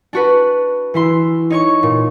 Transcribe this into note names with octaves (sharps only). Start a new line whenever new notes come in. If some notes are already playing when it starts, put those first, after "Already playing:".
D4 F#4 B4
E3 E4 C6
D#4 C#5 C#6
A#2